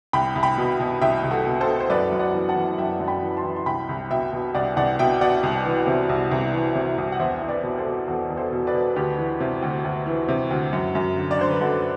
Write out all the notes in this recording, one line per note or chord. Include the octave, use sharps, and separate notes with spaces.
C2 G5 B5
C2
G5 B5
B2
B2
C2 E5 G5
C2
F#4 A4
B2
A4 C5
B2
C5
F#2 B4 D5
F#2
D5 F#5
E3
F#5 A5
E3
F#2 E5 G5
F#2
G5 B5
E3
A5 C6
E3
C6
C2 G5 B5
C2
B2 E5 G5
B2
C2 D5 F#5
C2 D5 F#5
B2 E5 G5
B2 D5 F#5
C2
E3
C3
C2
C2
E3
C3
C2
F#5
E2 C5 E5
E2
B4 D5
B2
A4 C5
B2
E2 F#4 A4
E2
A4 C5
B2
B4 D5
B2
D2 G4 B4
E3
C3
D2
D2
E3
C3
D2
F#2
F#2
D3
D5
D3 C5
B4
F#2 F#4 A4